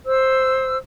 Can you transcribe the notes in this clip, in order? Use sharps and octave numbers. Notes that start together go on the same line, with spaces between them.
C5 E6